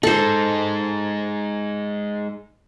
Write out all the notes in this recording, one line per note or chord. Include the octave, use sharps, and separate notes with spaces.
G#3 D#4 A4 C5